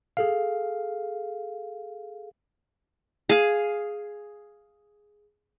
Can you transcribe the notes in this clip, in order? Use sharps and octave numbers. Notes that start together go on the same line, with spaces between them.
G#4 A4 F5
G#4 F5